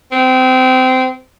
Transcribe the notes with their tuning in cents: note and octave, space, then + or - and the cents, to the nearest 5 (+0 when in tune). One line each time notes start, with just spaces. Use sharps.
C4 -25